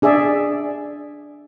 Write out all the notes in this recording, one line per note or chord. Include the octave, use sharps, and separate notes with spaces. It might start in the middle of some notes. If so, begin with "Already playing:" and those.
D4 G#4 D5 E5